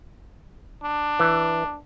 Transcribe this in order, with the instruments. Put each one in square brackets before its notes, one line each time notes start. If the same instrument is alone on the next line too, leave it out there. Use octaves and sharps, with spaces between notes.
[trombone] D4
[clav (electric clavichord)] E3